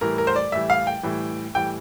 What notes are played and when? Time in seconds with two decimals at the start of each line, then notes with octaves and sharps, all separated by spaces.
0.01 A2 E3 G3 A#4
0.18 A#4
0.27 C5
0.36 D5
0.52 A2 E3 G3 E5
0.70 F5
0.87 G5
1.03 A2 E3 G3
1.55 A2 E3 G3 G5